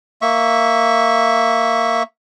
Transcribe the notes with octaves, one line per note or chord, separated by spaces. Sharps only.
A#3 E5 C#6